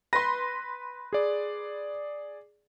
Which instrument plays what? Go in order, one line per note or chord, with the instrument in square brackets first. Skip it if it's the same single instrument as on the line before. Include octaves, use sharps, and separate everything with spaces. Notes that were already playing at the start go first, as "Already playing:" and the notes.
[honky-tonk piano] B4 C6 [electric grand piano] A#6
[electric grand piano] G#4 D5